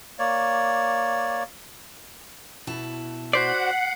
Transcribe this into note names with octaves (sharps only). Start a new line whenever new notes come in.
A#3 C#5 D5
B2 E4 A5
F#4 C5 D5 F#5 B6 C7